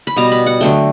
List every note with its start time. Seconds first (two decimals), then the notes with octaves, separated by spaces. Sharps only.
0.07 B5
0.16 B2 G3 B3 A#5
0.32 B5
0.46 F#5
0.61 D3 F#3 A3 G5